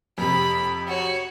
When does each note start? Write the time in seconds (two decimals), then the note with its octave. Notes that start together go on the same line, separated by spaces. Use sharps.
0.18 F2 C3 B5
0.88 F#4 C#5